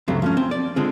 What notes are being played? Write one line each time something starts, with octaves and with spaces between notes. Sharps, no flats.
C#2 G2 F#3 A3 C4
F3 A3 C#4
C4
D5
D3 G#3 C4 F4